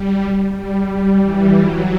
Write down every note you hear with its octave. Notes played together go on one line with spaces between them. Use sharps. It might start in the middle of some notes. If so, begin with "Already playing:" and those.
Already playing: G3
G3
G3
E3
F#3